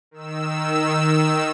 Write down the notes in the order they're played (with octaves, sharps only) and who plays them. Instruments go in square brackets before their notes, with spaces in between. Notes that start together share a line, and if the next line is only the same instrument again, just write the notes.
[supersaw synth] D#3 E6